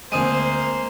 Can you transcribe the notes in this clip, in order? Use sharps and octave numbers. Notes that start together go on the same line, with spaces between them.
D2 G#3 A#3 C4 C5 D#6 D#7